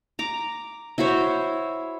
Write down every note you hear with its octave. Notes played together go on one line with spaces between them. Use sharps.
A#5 D6
E4 F#4 C5 C#5